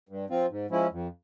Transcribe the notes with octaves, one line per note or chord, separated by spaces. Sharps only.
G2
F3 C4 F4
G#2
F3 G#3 C#4 E4
F2